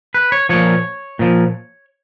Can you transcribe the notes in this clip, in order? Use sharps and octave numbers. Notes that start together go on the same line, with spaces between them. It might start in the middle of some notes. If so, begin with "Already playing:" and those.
B4
C#5
A#2 F3 C#5
A#2 F3